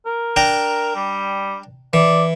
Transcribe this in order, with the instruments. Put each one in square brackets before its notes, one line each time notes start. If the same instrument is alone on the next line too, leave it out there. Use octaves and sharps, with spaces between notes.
[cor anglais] A#4
[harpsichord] D4 G5 A#5
[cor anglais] G3
[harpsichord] E3 [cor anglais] D5